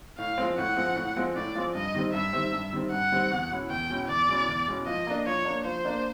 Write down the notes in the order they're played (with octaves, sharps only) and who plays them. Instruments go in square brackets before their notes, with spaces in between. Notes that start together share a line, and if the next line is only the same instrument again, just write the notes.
[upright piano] A2 [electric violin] F5
[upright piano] F3 G#3 C4
[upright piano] A2 [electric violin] F#5
[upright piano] F3 G#3 C4
A2
F3 G#3 C4
[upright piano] A2 [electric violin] D5
[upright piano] F3 G#3 C4
[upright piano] G2 [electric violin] D#5
[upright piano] D#3 G3 C4
[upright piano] G2 [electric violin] E5
[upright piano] D#3 G3 C4
G2
D#3 G3 C4
[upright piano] G2 [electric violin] F#5
[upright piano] D#3 G3 C4
E2
B2 G#3 C#4 E4
[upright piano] E2 [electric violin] G5
[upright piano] B2 G#3 C#4 E4
[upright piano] E2 [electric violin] D5
[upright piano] B2 G#3 C#4 E4
E2
B2 G#3 C#4 E4
[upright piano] F3 [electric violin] D#5
[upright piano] A#3 D4
[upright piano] F3 [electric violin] C#5
[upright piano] A#3 D4
[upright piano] F3 [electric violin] C5
[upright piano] A#3 D4